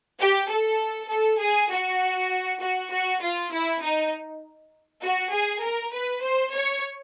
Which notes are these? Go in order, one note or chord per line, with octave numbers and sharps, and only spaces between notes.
G4
A4
A4
G#4
F#4
F#4
F#4
F4
E4
D#4
F#4
G#4
A#4
B4
C5
C#5